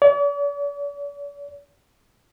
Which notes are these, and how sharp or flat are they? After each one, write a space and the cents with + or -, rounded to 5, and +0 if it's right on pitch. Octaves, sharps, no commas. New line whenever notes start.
D5 -45